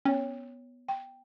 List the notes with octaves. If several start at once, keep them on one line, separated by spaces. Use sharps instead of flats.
B3 C#4 C#5
G5